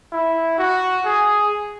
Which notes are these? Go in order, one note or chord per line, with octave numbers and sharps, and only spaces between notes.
E4
F#4
G#4